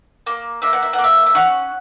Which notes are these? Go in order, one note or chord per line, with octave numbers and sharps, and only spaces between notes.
A#3
A#3 E5
F#5
E5
F#5
A#3
E5
E5
C#4 F#5